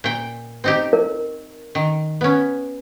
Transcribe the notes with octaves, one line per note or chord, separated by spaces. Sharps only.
A#2 G5
C4 D#4 G4
A#4
D#3
B3 C#4